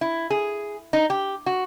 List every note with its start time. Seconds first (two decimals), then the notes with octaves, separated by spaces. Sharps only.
0.01 E4
0.30 G#4
0.93 D#4
1.10 G4
1.46 F#4